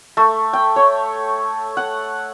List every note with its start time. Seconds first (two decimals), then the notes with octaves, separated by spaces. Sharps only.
0.17 A3
0.53 G5
0.76 C#5
1.77 F#5